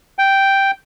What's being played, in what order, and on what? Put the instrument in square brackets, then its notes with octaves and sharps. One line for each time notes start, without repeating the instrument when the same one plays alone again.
[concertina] G5